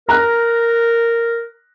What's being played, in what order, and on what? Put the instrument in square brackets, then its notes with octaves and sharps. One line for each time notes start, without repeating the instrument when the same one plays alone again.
[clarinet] A#4 [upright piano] A#5 F#6